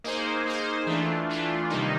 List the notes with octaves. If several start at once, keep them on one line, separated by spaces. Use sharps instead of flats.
A#3 D#4 G#4 C5
A#3 D#4 G#4 C5
E3 A3 D4 F4
E3 A3 D4 F4
C3 D#3 G3 A#3 D#4